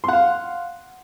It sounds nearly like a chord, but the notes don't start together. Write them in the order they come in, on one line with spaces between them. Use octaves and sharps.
C6 F#5 F5